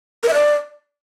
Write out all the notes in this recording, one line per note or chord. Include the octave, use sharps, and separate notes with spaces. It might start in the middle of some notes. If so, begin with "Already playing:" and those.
A#4
E5
D5